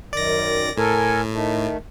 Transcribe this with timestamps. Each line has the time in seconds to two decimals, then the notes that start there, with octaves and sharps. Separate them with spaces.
0.13 F#2 D#3 D5 A#6
0.77 A2 A4 A#4 G#5
1.32 D#3 A3